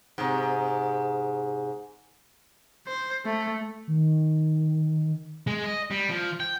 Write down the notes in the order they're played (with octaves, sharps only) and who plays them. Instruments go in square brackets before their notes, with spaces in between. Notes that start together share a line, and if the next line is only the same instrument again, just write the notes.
[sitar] G#2 C3
[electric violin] C5
A3
[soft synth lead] D#3
[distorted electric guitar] G#3
D#5
G3
F3
G5